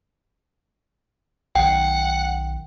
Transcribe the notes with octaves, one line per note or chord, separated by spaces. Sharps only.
B1 D#3 F#5 G5